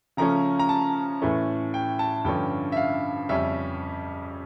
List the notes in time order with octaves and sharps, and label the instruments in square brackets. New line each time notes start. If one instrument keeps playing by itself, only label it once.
[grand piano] C#3 F3 A3 C#4 A#5
A#5
A5
A2 E3 A3 C#4
G5
A5
G2 D3 F3 C#4 G5
E5
F5
F2 C#3 G3 C#4 E5